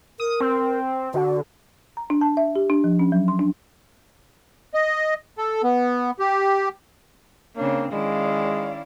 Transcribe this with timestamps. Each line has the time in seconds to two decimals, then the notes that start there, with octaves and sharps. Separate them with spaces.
0.20 A#4 D#6
0.41 C4
1.14 D3 F#4
1.97 A#5
2.10 D4
2.21 A5
2.37 E5
2.56 G4
2.70 D4
2.84 F3
2.99 C#4
3.12 F#3
3.28 C6
3.39 D4
4.74 D#5
5.38 A4
5.63 B3
6.19 G4
7.56 C#3 A#3 C4 D4 C#5
7.92 D#3 G#3 C#4 E4 D5 F5